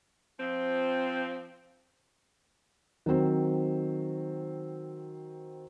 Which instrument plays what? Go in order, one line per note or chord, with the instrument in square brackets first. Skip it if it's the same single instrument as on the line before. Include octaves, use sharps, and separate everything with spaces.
[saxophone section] F3 C4
[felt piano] D#3 F#3 C4 C5